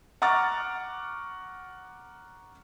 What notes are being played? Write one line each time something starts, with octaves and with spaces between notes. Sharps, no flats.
F#5 A#5 C#6 D6 F6 A6